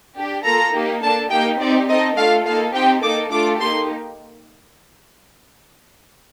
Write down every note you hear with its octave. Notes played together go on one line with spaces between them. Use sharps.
D4 G4
A#3 F4 A4 A#5
A#3 D#4 G4
A#3 D4 A4 A5
A#3 D#4 G4 G5
C4 D#4 G4 D5
C4 D#4 A4 D#5
A3 D4 F4 A4 F5
A#3 D#4 A4 F5
C4 D#4 G4 G5
A#3 D#4 A4 D6
A3 D4 F4 A4 D6
A#3 D#4 G4 C6